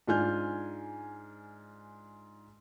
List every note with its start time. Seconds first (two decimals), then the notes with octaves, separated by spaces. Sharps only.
0.07 G#2 D4 F4 G#5 F6 G6